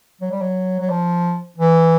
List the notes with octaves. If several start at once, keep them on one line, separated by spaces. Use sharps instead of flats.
F#3
G3
F#3
F#3
F3
E3